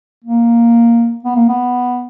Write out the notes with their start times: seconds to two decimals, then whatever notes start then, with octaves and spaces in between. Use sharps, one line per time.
0.24 A#3
1.24 B3
1.35 A#3
1.48 B3